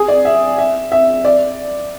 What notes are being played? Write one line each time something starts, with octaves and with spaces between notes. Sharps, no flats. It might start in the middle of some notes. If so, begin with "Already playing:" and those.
Already playing: G#4
D5
E5
E5
E5
D5